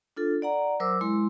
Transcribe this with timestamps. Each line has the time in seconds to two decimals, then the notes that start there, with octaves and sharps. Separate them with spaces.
0.17 D4 F4 A4
0.42 D5 F#5 A#5
0.80 F#3 A#4 C5 D6 E6
1.01 G#3 E4 C6